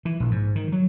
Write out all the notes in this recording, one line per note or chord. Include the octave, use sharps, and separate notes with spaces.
E3
A#1
G#2
D#3
F#3